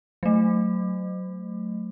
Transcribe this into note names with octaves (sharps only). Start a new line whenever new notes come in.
F#3 A3